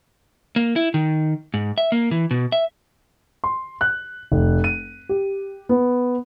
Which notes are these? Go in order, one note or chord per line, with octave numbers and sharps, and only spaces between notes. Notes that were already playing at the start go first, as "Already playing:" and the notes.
A#3
E4
D#3
G#2
E5
A#3
E3
B2
E5
C6
F#6
F1
D#7
G4
B3